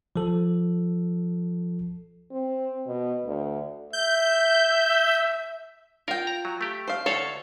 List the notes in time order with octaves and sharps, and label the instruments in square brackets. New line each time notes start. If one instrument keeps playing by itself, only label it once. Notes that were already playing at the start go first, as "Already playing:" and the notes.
[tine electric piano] F3 A4
[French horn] C4
B2
D2
[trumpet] E5 [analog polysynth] G6
[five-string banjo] F4 G5 [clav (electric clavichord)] A#4
[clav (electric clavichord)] A#5
F#3
A3 G4
[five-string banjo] C5 F5
[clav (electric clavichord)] D2 A4 F5 [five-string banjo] C#5